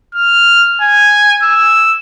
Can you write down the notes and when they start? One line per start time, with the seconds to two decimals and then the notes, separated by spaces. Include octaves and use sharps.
0.15 F6
0.82 G#5
1.43 E6